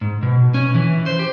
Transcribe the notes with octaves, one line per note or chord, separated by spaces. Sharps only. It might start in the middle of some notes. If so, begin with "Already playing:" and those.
G#2
B2
C#4
E3
C5
G4